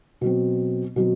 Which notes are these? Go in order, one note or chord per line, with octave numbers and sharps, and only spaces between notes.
B2 F#3 C4
B2 F#3 C4